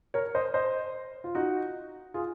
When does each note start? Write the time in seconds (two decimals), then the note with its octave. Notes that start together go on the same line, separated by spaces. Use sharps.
0.14 A#4 C#5
0.35 C5 D#5
0.54 C5 D#5
1.24 F4
1.35 D#4 F#4
2.14 F4 G#4